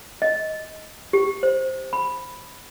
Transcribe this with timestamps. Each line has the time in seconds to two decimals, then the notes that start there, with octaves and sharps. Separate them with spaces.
0.22 D#5
1.13 G4
1.43 C5
1.93 B5